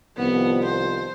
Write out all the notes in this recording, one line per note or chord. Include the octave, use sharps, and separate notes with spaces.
C2 D#3 F3 B3
C5